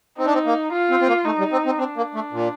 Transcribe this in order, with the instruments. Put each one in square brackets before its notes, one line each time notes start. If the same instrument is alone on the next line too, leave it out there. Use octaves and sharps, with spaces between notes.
[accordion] C4 [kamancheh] D#4
[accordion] D4
C4
A#3
[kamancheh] F4
[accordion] C4
C4
A#3
[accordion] A3 [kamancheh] D#4
[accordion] G3
C4
C4
[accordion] C4 [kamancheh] D4
[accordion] A#3
A3
A#2